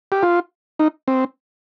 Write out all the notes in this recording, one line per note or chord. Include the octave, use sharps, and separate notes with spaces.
G4
F4
D#4
C4